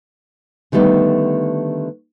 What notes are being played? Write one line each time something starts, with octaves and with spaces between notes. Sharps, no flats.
D3 D#3 G3 A3 B3